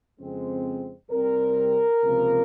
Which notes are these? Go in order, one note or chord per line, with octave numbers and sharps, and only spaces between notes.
F2 C#3 G#3 C4
C2 C3 G3 C4 A#4
C#2 C3 F3 A#3